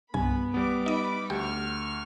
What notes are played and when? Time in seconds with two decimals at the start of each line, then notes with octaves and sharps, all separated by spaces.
0.14 C2 G2 B3 G#5 B5
0.54 G3 B3 D6
0.86 D#4 D#5 B5 D6
1.30 D2 G4 C#6 F6